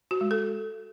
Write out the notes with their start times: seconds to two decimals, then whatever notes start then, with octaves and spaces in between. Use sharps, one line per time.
0.11 F#4
0.21 G#3
0.31 A4